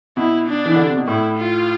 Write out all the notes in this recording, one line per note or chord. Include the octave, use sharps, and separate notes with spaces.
B2 E4
D4
E3
D3
C3
B2
A2 E4
F4